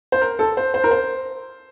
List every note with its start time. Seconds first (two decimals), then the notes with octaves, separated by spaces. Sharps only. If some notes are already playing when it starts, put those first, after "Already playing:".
0.12 C5
0.22 A#4
0.39 A4
0.57 C5
0.74 C5
0.84 A#4
0.91 C5